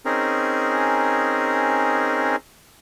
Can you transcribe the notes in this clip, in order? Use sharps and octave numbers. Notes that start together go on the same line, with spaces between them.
C4 C#4 D#4 G#4 A#4